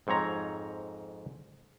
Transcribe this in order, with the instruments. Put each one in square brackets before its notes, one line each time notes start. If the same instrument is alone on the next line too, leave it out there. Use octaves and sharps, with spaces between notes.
[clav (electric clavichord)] F2 G#2 C4 C#5 A#5